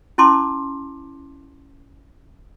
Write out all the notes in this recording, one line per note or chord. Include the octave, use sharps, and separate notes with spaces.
C#4 E4 A5 C6 D6